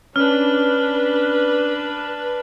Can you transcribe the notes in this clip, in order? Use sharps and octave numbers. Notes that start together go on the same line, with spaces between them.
C#4 D4 B4 F6